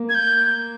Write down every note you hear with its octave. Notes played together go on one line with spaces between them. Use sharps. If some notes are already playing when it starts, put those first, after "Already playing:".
Already playing: A#3
G#6
G6